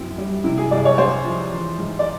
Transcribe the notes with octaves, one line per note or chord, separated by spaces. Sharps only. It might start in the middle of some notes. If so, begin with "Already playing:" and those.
Already playing: F#2 C4 E4
G3
C3 E4
G#4
C2 D5
C#5
G#3 C5
F3
E3
G#2
D5